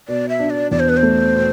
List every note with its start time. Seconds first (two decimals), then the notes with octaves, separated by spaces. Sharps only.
0.08 B2 D5
0.29 E5
0.40 D4
0.50 D5
0.71 E2 D5
0.79 C5
0.89 B4
0.97 C5
1.03 A3
1.34 B2